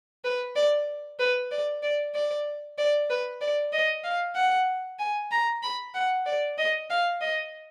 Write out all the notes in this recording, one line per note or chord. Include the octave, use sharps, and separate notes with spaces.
B4
D5
B4
D5
D5
D5
D5
B4
D5
D#5
F5
F#5
G#5
A#5
B5
F#5
D5
D#5
F5
D#5